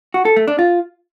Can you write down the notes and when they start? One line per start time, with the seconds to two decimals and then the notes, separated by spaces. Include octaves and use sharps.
0.14 F#4
0.25 A4
0.36 A3
0.48 D4
0.59 F4